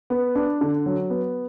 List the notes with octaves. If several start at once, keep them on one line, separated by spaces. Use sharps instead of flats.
B3
D4
D3
F#3
B3